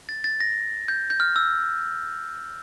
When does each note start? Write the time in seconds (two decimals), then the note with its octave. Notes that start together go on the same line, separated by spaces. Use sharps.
0.09 A6
0.24 A6
0.40 A#6
0.88 G6
1.10 G6
1.20 F6
1.36 E6